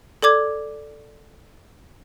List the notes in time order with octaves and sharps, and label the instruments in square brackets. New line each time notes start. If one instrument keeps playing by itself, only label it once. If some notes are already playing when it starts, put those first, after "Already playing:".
[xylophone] A4 D5 D6 G#6